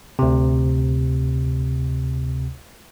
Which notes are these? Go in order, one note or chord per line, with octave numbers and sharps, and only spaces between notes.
D2 C3